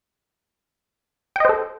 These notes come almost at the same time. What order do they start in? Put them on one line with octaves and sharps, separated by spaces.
G5 D#5 C5 A4